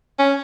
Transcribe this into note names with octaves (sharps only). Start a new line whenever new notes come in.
C#4